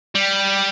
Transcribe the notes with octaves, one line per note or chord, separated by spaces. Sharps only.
G3